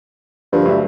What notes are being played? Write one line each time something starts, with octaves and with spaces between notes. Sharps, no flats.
G2 D3 F3 A#3
D2 F#3 E5